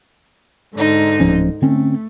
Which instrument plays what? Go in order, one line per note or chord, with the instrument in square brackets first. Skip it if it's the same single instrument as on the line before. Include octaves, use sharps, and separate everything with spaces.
[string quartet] G#2 D3 D#4
[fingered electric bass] D1 F3 C#4
[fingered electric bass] D3 C4 C#4 [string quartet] A3